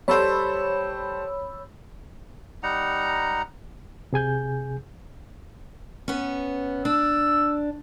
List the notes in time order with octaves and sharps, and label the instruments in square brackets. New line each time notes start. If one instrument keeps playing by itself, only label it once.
[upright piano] G3 A4 C5 [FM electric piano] C#5 B5 E6
[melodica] G3 D#4 F#5 A#5
[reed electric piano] C3 G#4 G#5 G6
[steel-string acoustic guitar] B3 C#4
[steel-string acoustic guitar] D4 [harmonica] E6